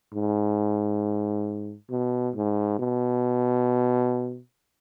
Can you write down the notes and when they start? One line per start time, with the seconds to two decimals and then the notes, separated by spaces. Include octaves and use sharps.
0.14 G#2
1.90 B2
2.36 G#2
2.79 B2